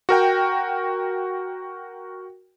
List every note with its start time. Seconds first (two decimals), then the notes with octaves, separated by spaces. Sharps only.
0.09 F#4 A#4 G5